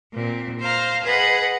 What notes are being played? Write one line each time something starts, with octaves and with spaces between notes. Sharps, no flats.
A#2 C4
C5 F5 A#5
G#4 B4 D#5 F#5